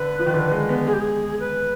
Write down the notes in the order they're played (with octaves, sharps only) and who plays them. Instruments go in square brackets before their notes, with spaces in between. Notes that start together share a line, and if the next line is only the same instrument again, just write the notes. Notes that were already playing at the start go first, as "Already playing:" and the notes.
Already playing: [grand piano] D3 [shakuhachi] B4
[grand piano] F3
D#3
D3
G#3
B3
[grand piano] G#3 [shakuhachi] G#4
[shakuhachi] G4
G#4
B4